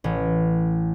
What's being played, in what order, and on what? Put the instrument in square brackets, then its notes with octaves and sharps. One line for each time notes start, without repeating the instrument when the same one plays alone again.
[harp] A1